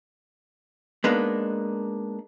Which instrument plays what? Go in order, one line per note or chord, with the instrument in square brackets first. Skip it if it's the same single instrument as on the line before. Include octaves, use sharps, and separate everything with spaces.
[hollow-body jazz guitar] G#3 A#3 B3 D4 D#4